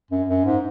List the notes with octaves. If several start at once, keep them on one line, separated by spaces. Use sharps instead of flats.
F#2
F#2
G#2